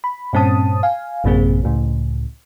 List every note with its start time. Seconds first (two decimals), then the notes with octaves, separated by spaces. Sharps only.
0.04 B5
0.33 G2 A#2 C4 C#4 A5 D#6
0.83 F5 G#5
1.24 A1 F#2 C3 A#3 C4 G#4
1.63 C#2 A2 C#3